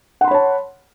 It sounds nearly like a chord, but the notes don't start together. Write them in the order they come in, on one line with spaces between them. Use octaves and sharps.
F#5 C6 B5 C#5 A5